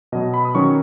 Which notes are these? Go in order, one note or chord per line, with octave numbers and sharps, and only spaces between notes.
B2 F#3 B3 D#5
B5
D#6
D#3 F#3 C#4 C#6